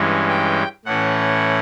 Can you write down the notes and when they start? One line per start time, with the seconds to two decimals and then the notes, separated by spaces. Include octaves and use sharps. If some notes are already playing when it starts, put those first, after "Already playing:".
Already playing: G2 E3 G#3 C#4
0.29 G5
0.85 A2 E3 A3 C#4 F#5